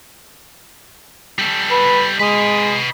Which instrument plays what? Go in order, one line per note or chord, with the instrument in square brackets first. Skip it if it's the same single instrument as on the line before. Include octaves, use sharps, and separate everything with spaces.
[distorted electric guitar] G3 A4
[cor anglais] B4
[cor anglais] G#3 [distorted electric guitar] B4 D#5